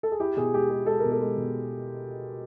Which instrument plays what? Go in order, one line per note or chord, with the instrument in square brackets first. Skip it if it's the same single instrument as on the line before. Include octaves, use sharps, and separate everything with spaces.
[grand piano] A4
G#4
[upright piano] E4 [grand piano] G4
[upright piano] B2 [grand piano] G#4
[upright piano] G#3 [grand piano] G4
[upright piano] G#3 [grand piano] G#4
[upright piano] G#3 [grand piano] A4
[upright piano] B2 [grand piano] A#4
[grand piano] A4
[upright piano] G#3
B2